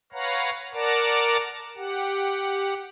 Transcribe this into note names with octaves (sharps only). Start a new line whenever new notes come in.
B4 C#5 F5 F#5 A#5
A#4 D5 F#5 A5 A#5 D6
G4 F#5